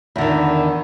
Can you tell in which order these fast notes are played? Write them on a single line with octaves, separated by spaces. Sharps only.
E2 D3 D#3